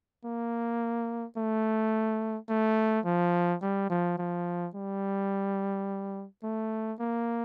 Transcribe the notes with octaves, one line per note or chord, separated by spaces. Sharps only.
A#3
A3
A3
F3
G3
F3
F3
G3
A3
A#3